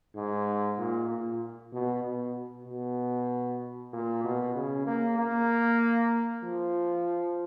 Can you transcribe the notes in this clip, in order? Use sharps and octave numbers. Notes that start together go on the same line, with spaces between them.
G#2
A#2
A#2
B2
B2
B2
A#2
B2
C#3
A#3
A#3
F3